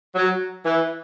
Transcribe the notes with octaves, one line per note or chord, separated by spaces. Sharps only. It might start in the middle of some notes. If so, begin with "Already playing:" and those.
F#3
E3